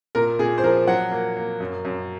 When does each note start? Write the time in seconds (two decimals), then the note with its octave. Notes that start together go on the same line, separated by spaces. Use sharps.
0.15 A#2 A#4
0.39 A#2 G#4
0.58 C5
0.64 F3 A#4
0.87 F#3 F#5
1.11 A#3
1.36 A#3
1.60 F#2
1.85 F#2